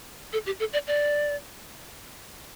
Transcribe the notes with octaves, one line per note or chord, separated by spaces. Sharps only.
A4
G4
A4
D5
D5